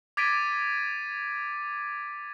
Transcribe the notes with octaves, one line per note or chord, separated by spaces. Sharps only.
D6 G#6 A6 B6 D7 D#7